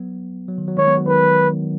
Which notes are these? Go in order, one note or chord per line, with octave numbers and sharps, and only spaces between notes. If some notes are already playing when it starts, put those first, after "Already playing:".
Already playing: F#3 B3
F#3
D#3
F#3
D#3 G#3 C#5
F#3 B3
F#3
D#3 B4